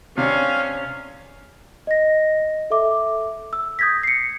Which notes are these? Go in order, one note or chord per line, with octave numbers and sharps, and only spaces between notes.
C3 C#4 D4 F5
D#5 A#6
A4 E5 D6
E6
D#6 G6 G#6 A#6 B6
C7 C#7